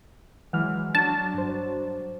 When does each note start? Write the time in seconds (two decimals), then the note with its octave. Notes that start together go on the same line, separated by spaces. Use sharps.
0.53 E3 F#3 G#3 F#5 F6
0.95 F#3 D4 F#4 A5
1.34 G2 C5